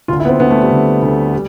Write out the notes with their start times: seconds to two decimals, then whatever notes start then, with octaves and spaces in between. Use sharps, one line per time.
0.08 D2 D3 F4
0.20 E4
0.25 B3
0.29 C4
0.40 D2 D3 B3
0.50 A3
0.61 G3
0.71 D2 D3
1.02 D2 D3
1.33 G3